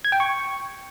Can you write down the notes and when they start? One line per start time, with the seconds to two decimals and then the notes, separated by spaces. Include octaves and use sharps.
0.05 G#6
0.12 G5
0.20 C#6